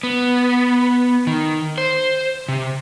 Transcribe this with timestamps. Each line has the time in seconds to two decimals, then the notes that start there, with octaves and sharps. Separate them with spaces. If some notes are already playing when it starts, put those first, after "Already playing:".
0.03 B3
1.27 D#3
1.78 C5
2.48 C3